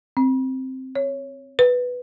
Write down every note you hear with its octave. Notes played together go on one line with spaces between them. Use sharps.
C4
C#5
B4